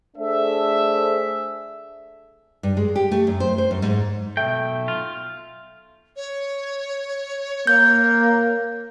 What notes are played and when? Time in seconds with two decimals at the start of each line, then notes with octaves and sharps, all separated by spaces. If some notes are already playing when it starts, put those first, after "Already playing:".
0.17 A3 D4 G#4 A4 C5 E5
2.63 G2
2.77 G#3
2.95 G4
3.11 A3
3.27 F#2
3.40 C5
3.58 C5
3.71 F#2
3.82 G#2
4.37 B1 E2 A3 G5
4.88 F4
6.15 C#5
7.67 A#3 G6